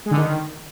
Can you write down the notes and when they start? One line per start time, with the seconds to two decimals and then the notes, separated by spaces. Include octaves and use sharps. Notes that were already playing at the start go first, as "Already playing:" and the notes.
0.06 G#3
0.11 D3
0.16 D#3